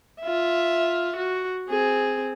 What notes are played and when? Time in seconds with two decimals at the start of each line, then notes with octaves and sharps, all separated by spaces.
0.21 F4 E5
1.16 F#4
1.69 C4 G#4